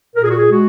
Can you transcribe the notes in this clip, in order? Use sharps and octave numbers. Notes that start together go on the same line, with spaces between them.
A#2 A#4
G#4
F#4
G#4
G#3 F#4